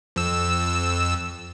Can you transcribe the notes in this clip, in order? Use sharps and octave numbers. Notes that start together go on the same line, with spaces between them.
F2 E6